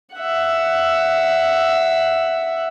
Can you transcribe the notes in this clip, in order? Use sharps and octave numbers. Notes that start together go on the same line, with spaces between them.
E5 F#5